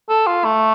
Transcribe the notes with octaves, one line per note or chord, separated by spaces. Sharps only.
A4
F4
A3